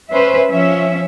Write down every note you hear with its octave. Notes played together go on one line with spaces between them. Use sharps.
C#4 B4 C5 E5
F3 C#4 E5